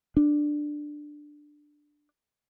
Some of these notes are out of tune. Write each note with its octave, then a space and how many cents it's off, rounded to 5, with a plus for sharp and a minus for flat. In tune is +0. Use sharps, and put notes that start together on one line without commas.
D4 +10